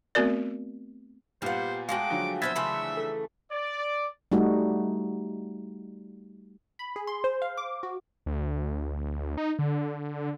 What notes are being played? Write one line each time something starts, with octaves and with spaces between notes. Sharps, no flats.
A3 B3 C4 F#4 A#4 D5
A#2 G3 B3 F4 C5 F#5
G#3 A3 F#4 F5 G5 D6
D3 F3 F#3
B3 C#4 C5 E5 G#6 A6 B6
C#3 E3 A3 B5 C6
A4
D5
G3 A3 D#4 F#4
B5
G#4
C6
C5
F5
D6
F#4
D2
D#4
D3